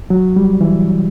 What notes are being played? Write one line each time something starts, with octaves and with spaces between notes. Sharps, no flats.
F#3
G3
E3